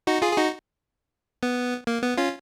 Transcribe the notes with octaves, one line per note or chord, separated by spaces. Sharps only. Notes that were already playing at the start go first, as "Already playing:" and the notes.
D#4 F#4
F4 G#4
G#4
D#4 F#4
B3
A#3
B3
C#4 F4